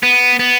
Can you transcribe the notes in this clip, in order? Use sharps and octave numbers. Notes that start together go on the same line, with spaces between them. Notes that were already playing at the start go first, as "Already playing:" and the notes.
B3
B3